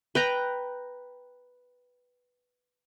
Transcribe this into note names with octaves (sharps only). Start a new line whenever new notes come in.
B4 G5 A#5